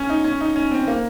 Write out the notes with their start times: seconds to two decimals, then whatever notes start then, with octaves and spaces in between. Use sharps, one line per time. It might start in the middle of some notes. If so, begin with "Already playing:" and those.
Already playing: C#4
0.09 D#4
0.24 C#4
0.41 D#4
0.56 C#4
0.71 C4
0.87 A#3